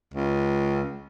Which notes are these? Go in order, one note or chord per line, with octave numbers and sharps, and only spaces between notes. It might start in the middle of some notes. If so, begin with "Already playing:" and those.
C#2